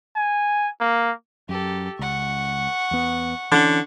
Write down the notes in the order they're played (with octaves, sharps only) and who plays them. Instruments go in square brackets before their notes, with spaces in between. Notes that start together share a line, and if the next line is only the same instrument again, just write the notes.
[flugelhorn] G#5
A#3
[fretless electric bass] F#2 [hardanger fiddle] G4 A4
[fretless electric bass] C#2 [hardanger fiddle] F#5 C#6
[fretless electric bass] E2 B3
[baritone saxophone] D3 [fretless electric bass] E3 C#4